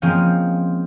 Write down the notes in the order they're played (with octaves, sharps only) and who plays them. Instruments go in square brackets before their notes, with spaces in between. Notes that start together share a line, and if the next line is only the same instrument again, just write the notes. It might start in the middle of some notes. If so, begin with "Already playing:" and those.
[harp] F3 G#3 A#3 C4 C#4